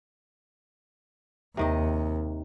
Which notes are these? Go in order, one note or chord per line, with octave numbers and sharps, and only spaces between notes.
D#2 C3 D#3 D#5